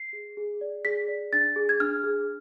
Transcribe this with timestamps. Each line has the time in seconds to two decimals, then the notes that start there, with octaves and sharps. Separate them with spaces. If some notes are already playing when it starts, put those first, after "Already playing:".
Already playing: C7
0.13 G#4
0.37 G#4
0.61 D5
0.85 G#4 B6
1.08 D5
1.33 D4 A6
1.56 G#4
1.69 G#6
1.80 D4 F6
2.03 G#4